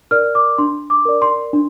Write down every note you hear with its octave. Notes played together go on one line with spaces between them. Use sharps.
A#4 D5 F6
D6
D4 C6
D6
A#4 D5
C6
D4